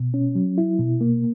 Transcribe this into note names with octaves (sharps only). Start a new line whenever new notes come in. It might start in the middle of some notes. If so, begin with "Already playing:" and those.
Already playing: B2
C#4
F#3
E4
B2
A#3